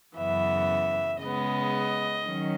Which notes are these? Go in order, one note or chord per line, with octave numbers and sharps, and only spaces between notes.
F#2 C#3 E3 B3 E5
C#3 G#3 B3 D#5
D#3 F#3 C#4